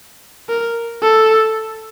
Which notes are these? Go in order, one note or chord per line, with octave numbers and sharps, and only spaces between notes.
A#4
A4